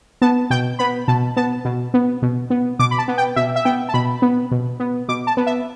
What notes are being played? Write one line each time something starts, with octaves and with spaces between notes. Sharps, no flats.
B3 A5
B2 G5
B3 B5
B2 A5
B3 A5
B2
B3
B2
B3
B2 D6
B5
A5
B3
G5
B2 E5
E5
B3 G5
A5
B2 B5
B3
B2
B3
B2 D6
A5
B3
E5